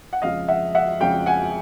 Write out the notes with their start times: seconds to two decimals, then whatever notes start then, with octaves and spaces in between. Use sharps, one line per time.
0.13 F#5
0.22 F2 C#3 F3 G#3 D#5 F5
0.48 E5 F#5
0.75 E5 F#5
1.01 F2 C#3 F3 G#3 F5 G5
1.26 F#5 G#5